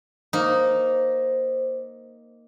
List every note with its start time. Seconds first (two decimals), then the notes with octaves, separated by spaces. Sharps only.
0.33 A#3 D#4 C5